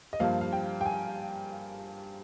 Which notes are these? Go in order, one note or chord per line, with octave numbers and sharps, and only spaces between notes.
D#5
G2 F3 A#3 F5
F5
G5
G5
G#5